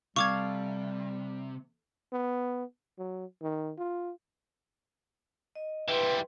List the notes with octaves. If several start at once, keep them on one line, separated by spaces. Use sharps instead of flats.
C3 G3 A4 F5 C#6 D6 G#6
B3
F#3
D#3
F4
D#5
E3 G3 B4 C6